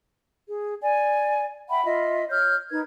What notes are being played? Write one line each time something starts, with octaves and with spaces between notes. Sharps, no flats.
G#4
D5 G#5
E5 F#5 G5 B5
F4 D#5 E5
C#5 F6 G6
D#4 A#4 B4 G#6